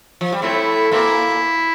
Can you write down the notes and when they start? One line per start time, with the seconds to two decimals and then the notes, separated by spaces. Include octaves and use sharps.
0.21 F3
0.32 G3
0.42 A2 A3 C4 E4
0.91 A#2 A#3 C4 E4